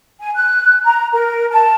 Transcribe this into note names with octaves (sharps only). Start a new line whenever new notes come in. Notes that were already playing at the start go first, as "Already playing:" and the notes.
G#5
F#6
A#5
A#4
A5